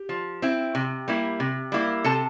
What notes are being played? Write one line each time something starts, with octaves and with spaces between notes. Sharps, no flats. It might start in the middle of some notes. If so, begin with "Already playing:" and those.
Already playing: G4
F3
C4 E4
C3
G3 A#3 E4
C3
G3 A#3 E4
C3 A4 A5